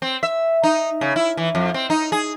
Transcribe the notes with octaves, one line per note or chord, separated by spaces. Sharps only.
C4
E5
D#4
C#3
E4
E3
F2
C4
D#4
G#4